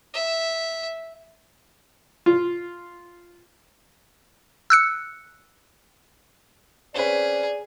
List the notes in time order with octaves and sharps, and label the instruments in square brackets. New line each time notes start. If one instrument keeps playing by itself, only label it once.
[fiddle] E5
[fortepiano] F4
[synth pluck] E6 F#6 C#7
[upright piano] C4 C#4 B4 [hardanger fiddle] G#4 [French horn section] D5